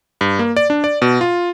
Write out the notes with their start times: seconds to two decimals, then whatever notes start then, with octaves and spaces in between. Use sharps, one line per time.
0.21 G2
0.39 A#3
0.57 D5
0.70 D4
0.84 D5
1.02 B2
1.21 F4